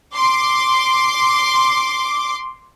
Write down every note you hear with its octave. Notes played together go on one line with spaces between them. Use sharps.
C6 D6